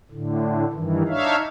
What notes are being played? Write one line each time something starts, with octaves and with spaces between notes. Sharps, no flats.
A2 D3
G2 D#3 E3
D4 D#4 C#5 E5 F5